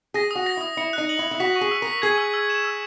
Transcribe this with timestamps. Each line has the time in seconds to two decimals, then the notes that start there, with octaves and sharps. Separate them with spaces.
0.14 G#4 A#6
0.31 F#4 D#6
0.46 A#6
0.57 E4 D#6
0.77 E4 C#7
0.93 D#4 F#6
1.09 F#7
1.19 E4
1.25 F#7
1.31 E4
1.40 F#4 B6
1.56 C#6
1.61 G#4
1.71 E6
1.82 A#4
1.87 B6
2.02 G#4 G#6
2.18 E6
2.34 E6
2.50 E7
2.64 E6